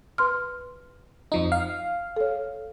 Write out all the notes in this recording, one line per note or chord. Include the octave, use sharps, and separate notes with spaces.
B4 C6 F6
F2 F3 D#4
F5
A4 C#5